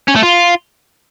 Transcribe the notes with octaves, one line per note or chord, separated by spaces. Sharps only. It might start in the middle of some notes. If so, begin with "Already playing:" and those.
C#4
A3
F4